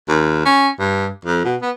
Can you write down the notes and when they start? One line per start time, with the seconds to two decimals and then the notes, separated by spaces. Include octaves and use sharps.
0.08 D#2
0.46 C#4
0.79 G2
1.25 F2
1.45 B2
1.62 B3